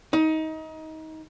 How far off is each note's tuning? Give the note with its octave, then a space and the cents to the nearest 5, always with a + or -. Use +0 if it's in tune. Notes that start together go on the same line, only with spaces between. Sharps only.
D#4 +25